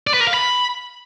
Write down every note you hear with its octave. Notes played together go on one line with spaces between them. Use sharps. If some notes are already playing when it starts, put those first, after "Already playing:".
D5
B4
A#4
F5
B5